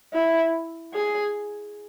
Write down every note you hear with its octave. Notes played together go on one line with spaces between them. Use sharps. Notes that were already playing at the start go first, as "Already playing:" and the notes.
E4
G#4